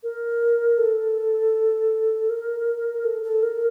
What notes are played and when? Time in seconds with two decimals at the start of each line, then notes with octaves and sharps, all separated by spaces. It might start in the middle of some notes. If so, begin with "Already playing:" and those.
0.03 A#4
0.78 A4
2.30 A#4
3.04 A4
3.23 A4
3.43 A#4